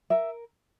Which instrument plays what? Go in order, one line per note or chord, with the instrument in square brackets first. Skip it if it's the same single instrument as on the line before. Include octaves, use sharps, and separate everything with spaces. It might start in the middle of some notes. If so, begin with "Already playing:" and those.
[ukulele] A#4 E5